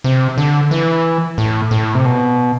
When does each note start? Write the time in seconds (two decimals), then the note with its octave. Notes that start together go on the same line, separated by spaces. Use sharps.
0.04 C3
0.38 D3
0.71 E3
1.38 A2
1.71 A2
1.95 C3
2.05 B2